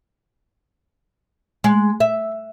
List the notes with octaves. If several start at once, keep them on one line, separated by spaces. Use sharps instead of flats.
G#3
E5